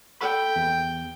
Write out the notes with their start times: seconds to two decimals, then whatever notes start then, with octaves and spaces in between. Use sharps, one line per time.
0.21 A4 G5 B5
0.56 E2